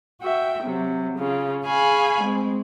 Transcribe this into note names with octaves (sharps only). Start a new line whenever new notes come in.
F#4 E5 G5
C3 F#3
C#3 F4
G#4 F5 G#5 B5 C#6
G#3 C4